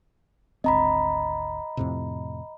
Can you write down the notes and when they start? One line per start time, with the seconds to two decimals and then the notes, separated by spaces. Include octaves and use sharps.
0.64 G#1 D2 C4 D#5 A#5 B5
1.77 F2 A2 C3